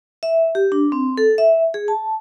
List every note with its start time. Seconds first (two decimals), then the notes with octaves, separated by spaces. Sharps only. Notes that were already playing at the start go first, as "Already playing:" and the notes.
0.23 E5
0.55 G4
0.72 D4
0.92 C4
1.17 A4
1.38 E5
1.74 G#4
1.88 A5